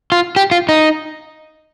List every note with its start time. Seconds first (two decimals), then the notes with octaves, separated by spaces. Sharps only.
0.12 F4
0.36 G4
0.51 F4
0.69 D#4